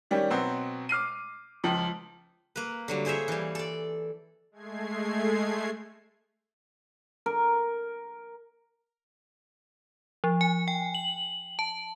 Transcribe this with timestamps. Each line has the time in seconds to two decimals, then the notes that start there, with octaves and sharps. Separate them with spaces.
0.11 D#3 G3 C#4 G4
0.30 B2 F#3 B3 C4
0.89 D6 F6 C7 D#7
1.64 C#2 F3
2.56 A#3 B4
2.88 D3 F#3 G3
3.05 E4 G#4 C5 C#5 E5
3.28 E3 G3
3.55 A4 D5
4.51 G#3 A3 G#6 C7
7.26 A#4
10.24 F3
10.41 G#5
10.68 G5
10.95 F#7
11.59 A5